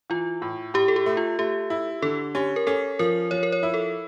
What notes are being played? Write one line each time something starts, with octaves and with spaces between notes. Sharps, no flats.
E3 F4
A2
A2 G4
A4
G4
A3
F4
A3 G4
E4
D3 A4
C#4 G4
A#4
C#4 A4
F3 A#4
F3 C#5
A#4
C#5
E4
A4